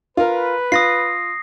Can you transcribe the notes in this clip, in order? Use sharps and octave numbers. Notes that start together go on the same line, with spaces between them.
F4 A#4 B4
F4 D#6 A#6 C7